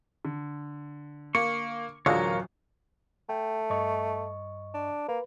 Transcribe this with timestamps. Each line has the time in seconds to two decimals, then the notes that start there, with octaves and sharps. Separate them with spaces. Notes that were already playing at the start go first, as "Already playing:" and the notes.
0.25 D3
1.35 A#3 C#6
2.06 D1 A1 D3 F#3 G#3 F4 A#4 C#5
3.29 A3 G5
3.70 G2 D#5 C#6
4.74 D4
5.08 A#3 B4